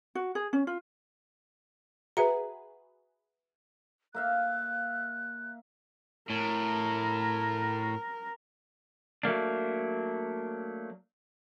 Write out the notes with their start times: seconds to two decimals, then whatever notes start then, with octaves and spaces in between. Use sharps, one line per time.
0.15 F#4
0.35 G#4
0.53 C#4
0.67 F4
2.17 F#4 G#4 B4 E5 A#5
4.14 A#3 E5 F5 F#6
6.30 A2 A#4
9.23 F#3 A3 A#3 D4